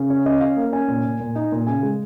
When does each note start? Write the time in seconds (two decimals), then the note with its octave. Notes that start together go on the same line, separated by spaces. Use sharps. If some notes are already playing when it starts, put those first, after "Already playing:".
Already playing: C#3
0.10 C#4
0.26 C#4 D#5
0.41 C#4 F5
0.57 A#3
0.73 C#4 G#5
0.88 A#2
1.05 A#2
1.20 A#2
1.35 D#4
1.52 A#2
1.67 C#3 G#5
1.83 G#3